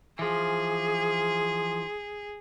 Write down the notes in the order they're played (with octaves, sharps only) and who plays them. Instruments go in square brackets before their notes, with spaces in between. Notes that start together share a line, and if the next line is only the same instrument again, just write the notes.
[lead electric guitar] E3 F3 [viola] G#4